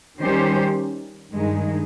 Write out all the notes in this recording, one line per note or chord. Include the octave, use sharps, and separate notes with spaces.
D#3 G3 C#4 G4 C5
G2 D#3 G#3